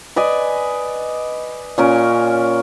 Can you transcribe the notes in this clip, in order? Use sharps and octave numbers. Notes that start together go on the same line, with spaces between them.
B4 D5 D#5 G#5
A#2 C#4 A#4